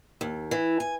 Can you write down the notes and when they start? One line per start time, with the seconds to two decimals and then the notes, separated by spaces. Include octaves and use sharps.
0.21 D#2
0.51 E3
0.80 G#5